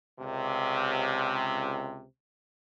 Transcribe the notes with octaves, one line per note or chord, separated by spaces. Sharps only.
C#2 C3